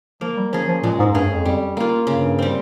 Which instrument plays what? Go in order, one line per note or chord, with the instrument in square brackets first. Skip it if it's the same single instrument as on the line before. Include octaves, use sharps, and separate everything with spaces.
[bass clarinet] F3 [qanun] A#3
[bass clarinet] G3
[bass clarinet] F3 [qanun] C#4 G#4
[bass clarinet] F3
[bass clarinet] A#2 [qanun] G#3
[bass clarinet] G#2
[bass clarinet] G2 [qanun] C#4 G#4
[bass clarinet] F2
[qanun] G3
A#3 F4
[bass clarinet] G2 [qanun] C#3
[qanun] G3 C4